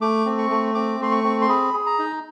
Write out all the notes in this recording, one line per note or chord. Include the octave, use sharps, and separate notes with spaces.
A3 D6
C4
C#6
A3
C4 D6
A3 C6
C#6
C4
C6
G#4 B5
G#4
A#5
D#4